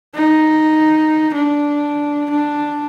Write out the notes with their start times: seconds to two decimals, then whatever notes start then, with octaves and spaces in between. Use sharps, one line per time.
0.15 D#4
1.34 D4
2.30 D4